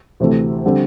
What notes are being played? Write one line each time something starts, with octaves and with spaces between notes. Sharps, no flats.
D2 C3 E3 A3
D3 G3 C4